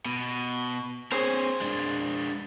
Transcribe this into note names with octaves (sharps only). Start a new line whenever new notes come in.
B2
C4 G#4 C5 C#5
G#3 D4